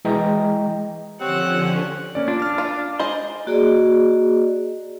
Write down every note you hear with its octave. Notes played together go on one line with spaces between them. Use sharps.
E3 G#3 D#5 G5 A#5
D3 F3 C4 C#4 G4 C#5 F#5
A#3 C#4 D5
D4 F4
F6 A6
F4
G#3 C5 D#5 C6
A#3 F#4 G#4 D5 D#5